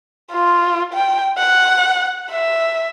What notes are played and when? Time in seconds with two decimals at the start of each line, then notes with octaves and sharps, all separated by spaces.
0.32 F4
0.94 G5
1.37 F#5
2.31 E5